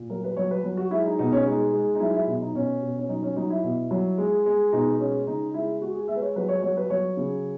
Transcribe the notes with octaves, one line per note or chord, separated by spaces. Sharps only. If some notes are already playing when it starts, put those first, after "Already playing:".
Already playing: A#2
F#3 A#4
B4
F#3 C#5
B4
F#3
F#4
G#3 E4
D#4
B2 D#4
C#4
G#3 D#4
G#3
D#4
F#3 E4
E4
B2 E4
D#4
B2 C#4
B2
C#4
F#3 D#4
C#4
F#3 D#4
E4
B2
F#3
G#3
G#3
B2 D#4
G#3 C#4
C#3 D#4
G#3 E4
G#3 F#4
G#4
G#3 E5
B4
C#5
F#3 B4
C#5
F#3 C#5
B4
F#3 C#5
C#3